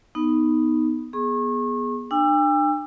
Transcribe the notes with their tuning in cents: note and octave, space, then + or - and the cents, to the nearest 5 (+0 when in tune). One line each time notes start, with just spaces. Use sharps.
B3 +0 D#4 +0
B3 -20 G#4 +5 C#6 -35
D4 +35 G5 +45 E6 +25